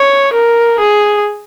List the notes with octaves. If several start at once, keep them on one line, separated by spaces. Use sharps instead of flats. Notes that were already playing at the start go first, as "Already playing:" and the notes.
Already playing: C#5
A#4
G#4